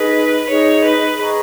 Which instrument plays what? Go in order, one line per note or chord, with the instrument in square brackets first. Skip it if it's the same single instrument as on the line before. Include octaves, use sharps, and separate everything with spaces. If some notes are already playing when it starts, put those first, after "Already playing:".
Already playing: [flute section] D#4 G#4 D#5 [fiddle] B4
[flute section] D#4 G#4 D#5 [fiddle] C#5
[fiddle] B4
[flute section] G#4 D#5 A#5 C#6